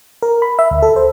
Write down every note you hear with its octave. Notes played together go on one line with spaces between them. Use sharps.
A#4
B5
E5
D2
A4
C5